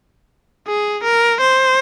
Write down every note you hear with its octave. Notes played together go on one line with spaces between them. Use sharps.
G#4
A#4
C5